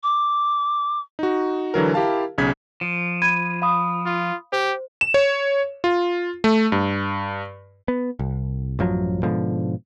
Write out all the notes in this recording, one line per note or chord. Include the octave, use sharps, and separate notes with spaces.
D6
D#4 F#4
D3 E3 F#3 A#4
E4 G4 A#4 F5 A5
B1 C#3 G#6 B6
F3
B5 G#6 D#7
F5 B5 D#6
F4
G4 C5
E7
C#5
F4
A3
G2
B3
C2
A1 F#2 F3 F#3
G#2 B2 D3 F3